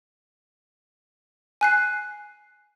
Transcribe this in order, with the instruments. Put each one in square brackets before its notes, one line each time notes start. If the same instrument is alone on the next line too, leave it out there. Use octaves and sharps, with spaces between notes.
[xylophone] G#5 F#6 C7